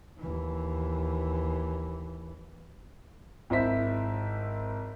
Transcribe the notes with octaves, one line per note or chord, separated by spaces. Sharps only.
D#2 E3
G#1 E4 C5 B6